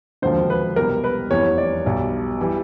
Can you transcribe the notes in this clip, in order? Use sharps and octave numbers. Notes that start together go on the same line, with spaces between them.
E1 D#2 D3 F3 C5
B4
C2 B2 G3 A#4
B4
F1 E2 C3 E3 G3 C#5
D5
B1 B2 G3
E3 G3